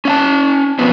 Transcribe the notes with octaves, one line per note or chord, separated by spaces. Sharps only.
C#4 F5 A5
F2 B2 B3 C4